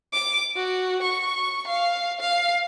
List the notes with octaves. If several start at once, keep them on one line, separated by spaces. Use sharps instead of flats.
D6
F#4
C#6
F5
F5